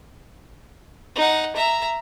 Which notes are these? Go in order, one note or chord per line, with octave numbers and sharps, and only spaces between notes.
D#4 F#5
E5 A#5